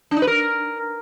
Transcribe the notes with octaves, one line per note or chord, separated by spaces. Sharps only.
D4
D#4
B4
A#4